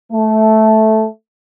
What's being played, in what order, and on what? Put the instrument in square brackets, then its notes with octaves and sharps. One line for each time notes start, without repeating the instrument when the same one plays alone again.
[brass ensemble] A3